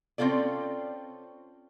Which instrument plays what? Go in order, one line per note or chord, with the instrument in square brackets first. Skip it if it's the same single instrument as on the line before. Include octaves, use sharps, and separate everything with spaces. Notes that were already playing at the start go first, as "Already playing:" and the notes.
[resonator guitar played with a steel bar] C4 C#4 F4 A4 D5